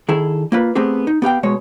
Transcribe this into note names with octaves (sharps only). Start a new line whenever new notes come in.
D#3 E4 G#4 A4
A#3 F4 B4
A3 B3 C4 G4 G#4
D#4
B3 G4 F5 G5
B2 G#3 C#5